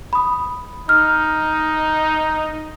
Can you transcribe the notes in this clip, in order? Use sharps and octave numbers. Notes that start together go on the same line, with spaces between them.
B5 D#6
D#4 F6